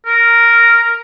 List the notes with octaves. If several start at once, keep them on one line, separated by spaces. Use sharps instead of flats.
A#4